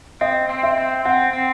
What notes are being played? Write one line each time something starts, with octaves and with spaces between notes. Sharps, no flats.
C4 D#5
C4
E5
C4
C4 F#5
C4